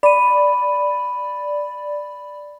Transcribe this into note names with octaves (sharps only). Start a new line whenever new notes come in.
D5 B5 D#7